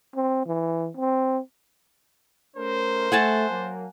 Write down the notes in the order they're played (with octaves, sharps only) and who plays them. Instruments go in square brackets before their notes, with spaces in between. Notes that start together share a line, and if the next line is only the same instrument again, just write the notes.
[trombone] C4
E3
C4
[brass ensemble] A3 C#4 A#4 [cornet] C5
[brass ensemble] A3 [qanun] F#5 G#5 A5
[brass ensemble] F#3 A#3